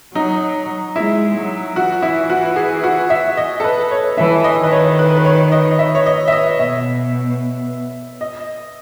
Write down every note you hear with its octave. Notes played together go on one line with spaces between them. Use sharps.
F#3 D#4
G#3 E4
F#3
E3 F#4
E4
F#4
G#4
F#4
E5
D#5
A4
B4
C#5
E3 E5
D#5
D#3 B4
C#5
B4
B4
C#5
D#5
E5
C#5
D#5
E5
D#5
B2 E5
D#5